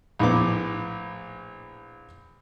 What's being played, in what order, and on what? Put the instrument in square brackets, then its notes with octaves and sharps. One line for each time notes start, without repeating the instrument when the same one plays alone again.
[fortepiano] A#1 A2 B3 D6